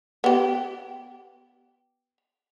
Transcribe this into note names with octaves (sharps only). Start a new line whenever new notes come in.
B3 G4